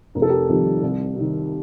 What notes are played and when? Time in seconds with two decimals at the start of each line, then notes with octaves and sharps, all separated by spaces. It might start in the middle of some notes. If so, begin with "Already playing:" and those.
0.15 F1 A#4
0.22 A4
0.29 G4 A#4
0.49 F2 D#3 G3
0.83 C2
1.16 C3 D#3